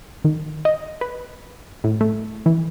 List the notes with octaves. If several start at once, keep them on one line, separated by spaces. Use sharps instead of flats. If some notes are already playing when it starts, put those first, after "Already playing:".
D#3
D#5
B4
A2
A3
E3